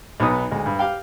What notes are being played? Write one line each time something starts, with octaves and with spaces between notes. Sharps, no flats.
B1 B3 D#4 D#6
D2 G#3
G2
G4 F5 G5